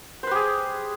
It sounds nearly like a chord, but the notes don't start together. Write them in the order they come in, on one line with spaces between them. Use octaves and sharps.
C5 B4 G4 G#4